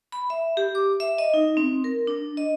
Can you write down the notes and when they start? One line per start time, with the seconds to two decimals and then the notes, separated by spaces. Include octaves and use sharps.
0.12 B5
0.30 E5
0.57 G4
0.75 D6
1.00 E5
1.18 D#5
1.34 D#4
1.57 C4
1.84 A#4
2.07 D4
2.37 D#5